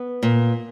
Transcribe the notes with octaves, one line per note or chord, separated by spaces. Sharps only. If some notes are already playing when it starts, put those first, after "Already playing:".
Already playing: B3
A#2